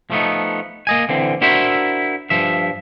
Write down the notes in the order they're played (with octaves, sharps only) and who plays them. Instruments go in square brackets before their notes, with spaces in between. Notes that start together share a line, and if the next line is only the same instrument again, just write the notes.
[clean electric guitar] F3 A3 B3 D#4
A#3 D#5 G#5
D3 E3 C4
D4 E4 F#4 A#4 C5 E5
G2 F3 E5